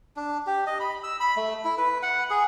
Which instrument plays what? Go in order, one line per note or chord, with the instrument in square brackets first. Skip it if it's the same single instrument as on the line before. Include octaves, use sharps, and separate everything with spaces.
[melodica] D4
G4
D#5
B5
E6
B5
A3
E4
B4
F#5
G#4